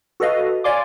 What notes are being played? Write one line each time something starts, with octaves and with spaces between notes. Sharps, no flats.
F#4 A4 B4 D#5 F5
C#5 D5 F5 G#5 C6 D6